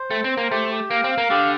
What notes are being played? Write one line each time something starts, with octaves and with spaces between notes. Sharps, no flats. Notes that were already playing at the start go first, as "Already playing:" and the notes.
Already playing: C5
A3 G5
C4
C5
A#3
A3 G4
G4
A#3 F5
C4
F5
A#3
D3 G4